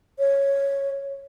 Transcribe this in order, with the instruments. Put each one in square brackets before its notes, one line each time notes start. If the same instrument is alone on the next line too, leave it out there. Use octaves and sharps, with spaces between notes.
[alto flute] C#5